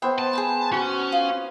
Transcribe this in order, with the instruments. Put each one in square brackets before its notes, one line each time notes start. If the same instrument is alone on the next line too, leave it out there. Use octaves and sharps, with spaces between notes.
[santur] B3 C5 [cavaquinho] E5 G5 C6
[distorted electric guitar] A5
[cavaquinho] G#4 B4 G5
[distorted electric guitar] C#4 [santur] F#4
[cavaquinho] F4 D#6